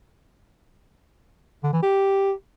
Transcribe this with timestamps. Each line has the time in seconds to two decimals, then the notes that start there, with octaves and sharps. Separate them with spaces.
1.63 D3
1.73 E3
1.83 G4